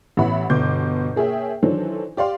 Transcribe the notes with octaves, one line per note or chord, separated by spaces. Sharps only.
A1 E3 B3 E5 F#5 B5
G1 B2 C6 D6 G6
A#3 G#4 C#5 E5 G5
D#3 E3 F#3 D4 A4 C5
G4 D5 F5 C6